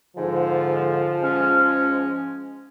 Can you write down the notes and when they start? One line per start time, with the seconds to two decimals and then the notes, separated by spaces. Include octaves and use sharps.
0.16 G#2 D3 F3
1.23 G#2 G#3 C#4